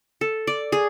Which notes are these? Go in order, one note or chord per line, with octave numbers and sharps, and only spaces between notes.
A4
D5
G#4